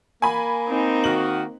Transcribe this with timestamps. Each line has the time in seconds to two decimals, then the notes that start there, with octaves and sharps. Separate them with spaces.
0.22 A#3 G#5 B5
0.68 C4 D#4
1.04 D#3 F#4 F#7